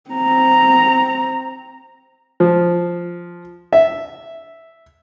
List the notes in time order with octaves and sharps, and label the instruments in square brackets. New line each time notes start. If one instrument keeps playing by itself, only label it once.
[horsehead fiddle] C4 A#5
[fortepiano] F3
E5